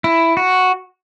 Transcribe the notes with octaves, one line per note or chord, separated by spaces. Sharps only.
E4
F#4